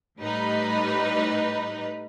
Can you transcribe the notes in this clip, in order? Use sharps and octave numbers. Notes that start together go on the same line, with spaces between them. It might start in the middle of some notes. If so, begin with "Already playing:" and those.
A2 G3 D#4 B4